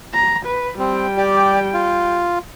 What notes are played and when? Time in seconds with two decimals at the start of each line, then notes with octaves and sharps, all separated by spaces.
0.14 A#5
0.46 B4
0.79 G3 C4 G5
1.17 G4 D5
1.74 F4